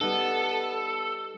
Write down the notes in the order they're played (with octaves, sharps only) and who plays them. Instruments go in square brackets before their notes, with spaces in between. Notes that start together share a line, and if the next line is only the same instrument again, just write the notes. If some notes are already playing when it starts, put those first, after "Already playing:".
[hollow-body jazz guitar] G3 D#4 [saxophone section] B3 [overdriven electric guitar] A4